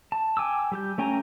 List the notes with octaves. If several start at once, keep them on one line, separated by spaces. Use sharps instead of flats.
A5
G5 G#5 D6 E6
G3 G4 G6
A3 C#4 G5 G#5 A#5